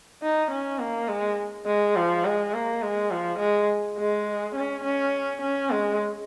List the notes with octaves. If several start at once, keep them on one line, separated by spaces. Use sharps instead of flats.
D#4
C#4
A#3
G#3
G#3
F3
G#3
A#3
G#3
F3
G#3
G#3
C#4
C#4
C#4
G#3